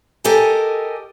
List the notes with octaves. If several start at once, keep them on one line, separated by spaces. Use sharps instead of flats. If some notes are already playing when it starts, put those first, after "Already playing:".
G4 A4 A#4 D#5 G#5